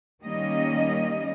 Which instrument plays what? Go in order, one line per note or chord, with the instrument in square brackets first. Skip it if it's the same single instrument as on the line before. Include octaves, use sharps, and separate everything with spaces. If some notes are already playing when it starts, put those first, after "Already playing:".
[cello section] D#3 G3 A#3 C#4 D#5